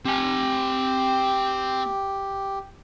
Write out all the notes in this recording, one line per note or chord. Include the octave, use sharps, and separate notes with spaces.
C4 G4 G#5